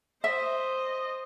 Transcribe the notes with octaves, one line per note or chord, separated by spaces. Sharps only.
C5 D#5 E5